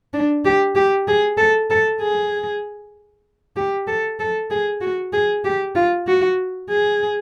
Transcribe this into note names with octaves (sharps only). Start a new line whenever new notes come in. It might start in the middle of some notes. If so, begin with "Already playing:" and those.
D4
G4
G4
G#4
A4
A4
G#4
G4
A4
A4
G#4
F#4
G#4
G4
F4
F#4
G#4